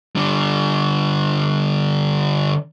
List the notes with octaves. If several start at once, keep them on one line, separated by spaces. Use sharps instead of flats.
D3 G3